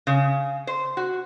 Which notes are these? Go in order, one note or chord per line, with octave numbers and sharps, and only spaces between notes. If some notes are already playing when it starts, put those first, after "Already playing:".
C#3
C5
F#4